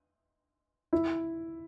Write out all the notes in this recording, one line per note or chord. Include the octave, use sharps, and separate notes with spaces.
E4